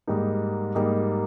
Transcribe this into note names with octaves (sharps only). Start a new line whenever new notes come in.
G#2 G3 A#3 D#4
G#2 G3 A#3 D#4